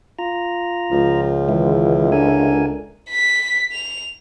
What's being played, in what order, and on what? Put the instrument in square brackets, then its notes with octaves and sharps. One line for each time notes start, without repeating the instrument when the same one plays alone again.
[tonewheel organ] F4 A#5
[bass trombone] C#2 [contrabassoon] F3
[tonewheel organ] D#3 E3 G#3 [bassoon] E4
[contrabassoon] D3 [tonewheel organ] A#4 G#5
[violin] B6
F7